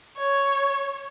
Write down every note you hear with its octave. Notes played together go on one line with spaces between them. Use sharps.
C#5